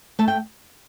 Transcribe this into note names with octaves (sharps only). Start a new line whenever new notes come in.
A3 A5
G5